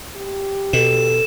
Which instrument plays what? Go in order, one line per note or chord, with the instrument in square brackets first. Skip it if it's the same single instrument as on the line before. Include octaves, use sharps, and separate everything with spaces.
[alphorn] G4
[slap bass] B2 [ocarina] A4 [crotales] E7